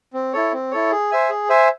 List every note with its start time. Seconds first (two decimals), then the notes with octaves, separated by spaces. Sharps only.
0.13 C4
0.33 E4 A4 C#5
0.53 C4
0.71 E4 A4 C#5
0.91 G#4
1.11 C5 E5 G#5
1.29 G#4
1.49 C5 E5 G#5